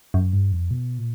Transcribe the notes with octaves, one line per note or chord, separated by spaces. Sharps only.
F#2
G2
F2
B2
A#2